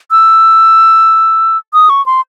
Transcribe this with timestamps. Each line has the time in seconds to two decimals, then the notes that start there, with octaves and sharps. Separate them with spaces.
0.11 E6
1.74 D#6
1.90 C#6
2.06 C6